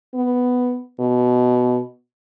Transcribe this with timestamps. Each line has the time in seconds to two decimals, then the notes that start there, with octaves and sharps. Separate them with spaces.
0.14 B3
1.00 B2